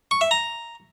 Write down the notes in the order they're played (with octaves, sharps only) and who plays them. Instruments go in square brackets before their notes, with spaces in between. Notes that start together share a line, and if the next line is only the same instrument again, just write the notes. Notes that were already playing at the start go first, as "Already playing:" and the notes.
[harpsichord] C#6
E5
A#5